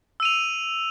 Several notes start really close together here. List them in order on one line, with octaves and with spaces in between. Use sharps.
E6 D#7 F7